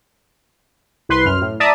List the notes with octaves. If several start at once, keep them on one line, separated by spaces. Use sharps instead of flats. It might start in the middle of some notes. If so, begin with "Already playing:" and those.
C2 B4 C6
F#2 F6
A2
D5 E5 A5 A#5 D#6